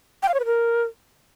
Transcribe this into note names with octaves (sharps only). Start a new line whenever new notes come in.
G5
F5
C#5
B4
A#4